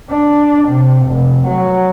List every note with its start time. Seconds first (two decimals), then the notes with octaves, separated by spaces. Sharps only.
0.11 D4
0.69 C3
1.07 F1
1.47 F#3